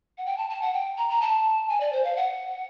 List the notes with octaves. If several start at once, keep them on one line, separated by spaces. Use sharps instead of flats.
F#5
G5
A5
A5
F#5
G5
A#5
A#5
A5
G#5
D5
C5
F5
F#5